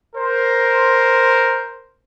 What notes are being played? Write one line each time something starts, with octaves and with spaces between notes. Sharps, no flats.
A#4 C5